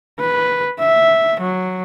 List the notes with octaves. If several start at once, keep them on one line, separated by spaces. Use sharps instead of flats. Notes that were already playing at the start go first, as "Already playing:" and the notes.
B4
E5
F#3